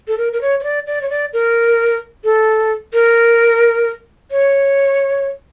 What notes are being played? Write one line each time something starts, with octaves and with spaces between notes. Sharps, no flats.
A4
A#4
A#4
C#5
C#5
D5
D5
C#5
D5
A#4
A4
A#4
C#5